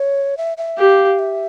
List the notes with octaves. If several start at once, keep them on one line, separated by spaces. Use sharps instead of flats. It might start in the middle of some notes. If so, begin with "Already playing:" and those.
Already playing: C#5
E5
E5
G4 F5
E5